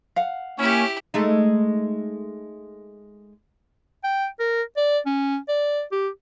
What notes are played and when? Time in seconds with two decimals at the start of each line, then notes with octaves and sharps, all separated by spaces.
0.16 F5 F#5
0.58 A#3 C#4 E4 G4
1.14 G#3 A3 D#4
4.04 G5
4.40 A#4
4.77 D5
5.06 C#4
5.48 D5
5.92 G4